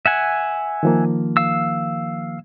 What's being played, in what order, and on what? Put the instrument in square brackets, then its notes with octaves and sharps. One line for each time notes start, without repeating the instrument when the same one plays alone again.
[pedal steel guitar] E5 F#5 G#5
[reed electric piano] D#3 F3 A#3
[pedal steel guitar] F5 E6